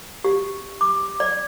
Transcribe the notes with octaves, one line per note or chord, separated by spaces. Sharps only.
G4
D6
D5